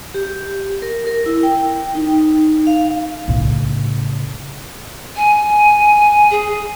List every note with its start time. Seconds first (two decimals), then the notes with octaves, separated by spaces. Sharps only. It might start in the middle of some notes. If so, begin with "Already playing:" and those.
0.14 G4
0.82 A#4
1.07 A#4
1.26 E4
1.43 G5
1.95 D#4
2.67 F5
3.28 A2 C#3
5.16 G#5
6.31 G#4